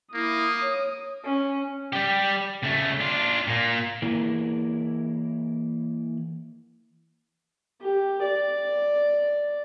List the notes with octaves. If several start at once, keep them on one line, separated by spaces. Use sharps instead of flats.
A#3 E4 D#6
C#5
C#4
G3 G4
C#3 A3
D4 F4
A#2 A#3
E3 A#3 E4 G#4 A#4
G4
D5